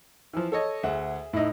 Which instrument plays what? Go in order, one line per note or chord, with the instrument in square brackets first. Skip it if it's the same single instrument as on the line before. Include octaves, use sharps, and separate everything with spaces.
[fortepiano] E3 F3
A4 C#5 D#5
[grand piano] D2 F#5 [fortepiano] G#4 E5
[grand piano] A2 D#5 [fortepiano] D#4 E4